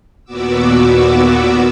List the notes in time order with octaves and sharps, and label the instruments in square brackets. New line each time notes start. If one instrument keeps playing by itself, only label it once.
[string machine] D#2 A#2 B3 F#4 D6 E6